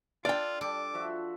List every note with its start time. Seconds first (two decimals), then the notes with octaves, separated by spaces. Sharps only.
0.25 D4 F4 A4 D5 G5
0.61 G3 A4 D6
0.94 F3 F#4 E5